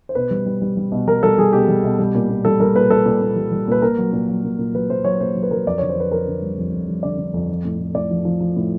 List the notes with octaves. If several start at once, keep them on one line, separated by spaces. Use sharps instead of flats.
C5
B2 B4
G3
G3
G3
G3
B2
G3 A#4
G3 A4
G3 G#4
B2 G4
G3
B2
G3
A#2
A#2
G3 A4
G3 A#4
A#2 B4
G3 A4
A#2
A#2
G3
G3
A#2 B4
A#2 A#4
F#3
A#2
F#3
A#2
A#2
F#3 B4
A#2 C5
F#3 C#5
A#2 C5
F#3
B4
F#3 A#4
F2 D5
D3 C#5
C5
F2 B4
F2 A#4
D3
G3
F2
F2
G3
D3 D5
D3
F2
F3
A2
A2
A2 D5
F3
F3
F3
A2